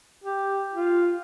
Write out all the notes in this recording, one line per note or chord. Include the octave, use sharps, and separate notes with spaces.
G4
F4